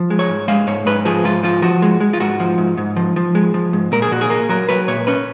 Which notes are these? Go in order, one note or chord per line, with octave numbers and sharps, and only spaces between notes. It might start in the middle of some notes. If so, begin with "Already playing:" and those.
Already playing: F3
G#3
C#5
G#2
G#3 F5
G#2 C#5
G#2 B4
F3 G#4
G#2 F4
F3 F4
F3 F#4
G#3
G#3
F4
G#2 F#4
F3
G#2
G#2
F3
F3
G#3
F3
G#2
A#2 A#4
G#4
A#2 F#4
G#4
A#3
F#3 A#4
F#3 B4
A#2 C#5
C#4 B4